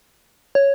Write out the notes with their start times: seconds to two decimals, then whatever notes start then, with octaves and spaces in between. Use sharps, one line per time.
0.55 C#5